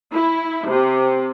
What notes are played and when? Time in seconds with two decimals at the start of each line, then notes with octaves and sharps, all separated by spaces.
0.13 E4
0.68 C3